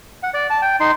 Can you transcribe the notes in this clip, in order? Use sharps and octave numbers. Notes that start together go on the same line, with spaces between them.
F#5
D5
A5
G5
D#4 C6